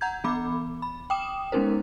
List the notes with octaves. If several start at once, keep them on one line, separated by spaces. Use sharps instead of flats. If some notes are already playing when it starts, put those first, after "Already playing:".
F#5 A#5 G6 G#6
E3 B3 B5 D6
B5
G5 D6 D#6 E7
G#3 B3 C#4 D#4 A#4 C5